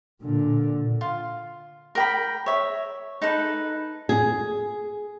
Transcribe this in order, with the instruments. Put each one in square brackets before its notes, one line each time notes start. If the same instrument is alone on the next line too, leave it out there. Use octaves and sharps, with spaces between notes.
[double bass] A#2 D3
[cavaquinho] F4
A#4 G5 B5
C#5 E5
D#4 A4 B4
[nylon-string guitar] G#4